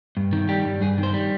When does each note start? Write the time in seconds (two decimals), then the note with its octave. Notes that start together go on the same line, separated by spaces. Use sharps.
0.17 G2
0.33 D#3
0.49 G3 G4
0.65 G2
0.81 G2 G#4
0.98 D#3
1.03 C5
1.14 G3